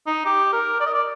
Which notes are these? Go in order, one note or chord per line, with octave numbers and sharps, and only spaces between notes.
D#4
G4
A#4
D5
D#5
D5